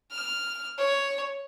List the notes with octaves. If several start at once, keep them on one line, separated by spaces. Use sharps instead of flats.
F6
C#5